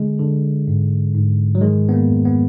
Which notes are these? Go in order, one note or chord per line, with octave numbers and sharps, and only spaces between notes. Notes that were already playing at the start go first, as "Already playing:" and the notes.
Already playing: D3 G#3
D3
G#2
G#2
F#3
D#3 G#3
B3
A#3
F2
B3